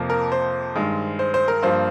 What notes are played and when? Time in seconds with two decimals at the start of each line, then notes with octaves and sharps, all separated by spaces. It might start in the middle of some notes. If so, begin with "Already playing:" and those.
Already playing: F2 C3 F3 A#3
0.10 A#4
0.32 C5
0.75 G2 D#3 G#3
1.19 C5
1.34 C5
1.48 A#4
1.63 G2 F3 A#3 C5